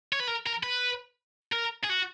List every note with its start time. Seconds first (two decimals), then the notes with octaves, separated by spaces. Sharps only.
0.13 C#5
0.20 B4
0.28 A#4
0.46 A#4
0.63 B4
1.53 A#4
1.84 G#4
1.90 F#4